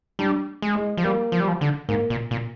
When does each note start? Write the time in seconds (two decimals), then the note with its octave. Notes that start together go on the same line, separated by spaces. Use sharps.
0.19 G3 D4
0.62 G#3
0.76 G#3
0.97 F3
1.04 G3 A#3
1.32 F3
1.40 G3
1.48 F3
1.61 D3
1.89 G#2 A#3
2.10 A#2
2.31 A#2